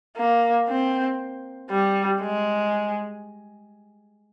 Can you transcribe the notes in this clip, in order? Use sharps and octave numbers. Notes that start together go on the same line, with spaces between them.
A#3
C4
G3
G#3